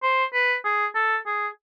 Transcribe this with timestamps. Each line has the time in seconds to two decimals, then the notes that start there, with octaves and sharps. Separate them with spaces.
0.03 C5
0.33 B4
0.65 G#4
0.95 A4
1.26 G#4